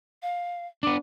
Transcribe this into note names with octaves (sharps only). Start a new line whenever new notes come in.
F5
B3 D4 D6